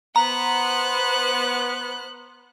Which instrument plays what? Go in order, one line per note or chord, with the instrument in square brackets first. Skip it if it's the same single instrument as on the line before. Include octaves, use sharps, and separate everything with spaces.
[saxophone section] B3 [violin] C5 F#6 [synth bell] A#5